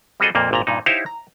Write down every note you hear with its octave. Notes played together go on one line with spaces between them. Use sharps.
G3 C4 F#4 G#4 A4 D#5
F2 A#2 A#3
G#1 A#2 A#5
G2 A#2 D#4
D#4 E4 G4 C5 C#5 F5
A#5